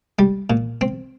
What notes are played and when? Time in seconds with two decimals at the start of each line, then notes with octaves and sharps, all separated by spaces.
0.19 G3
0.50 A#2
0.81 C4